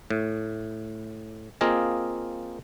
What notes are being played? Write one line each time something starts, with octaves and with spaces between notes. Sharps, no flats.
A2
A#3 C4 F4 G#4 D#5